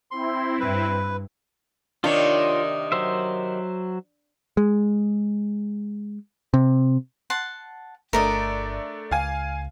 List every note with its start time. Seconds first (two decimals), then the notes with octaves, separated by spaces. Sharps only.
0.11 C4 E4 C6
0.60 G2 B4
2.04 C3 D#3 A#3 D4 F4 C#5
2.92 F#3 C5 E5
4.57 G#3
6.54 C3
7.30 F#5 A5 C6
8.13 G1 A3 D4 A#4 D5 D#5
9.11 C#2 F5 G#5